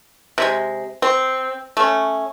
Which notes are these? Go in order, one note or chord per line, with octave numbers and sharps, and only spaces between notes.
C3 G#3
C4
A3 C#4